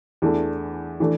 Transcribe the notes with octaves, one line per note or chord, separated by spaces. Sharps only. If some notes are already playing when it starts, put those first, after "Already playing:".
E2 E3 A3 D4
E3 A3 D4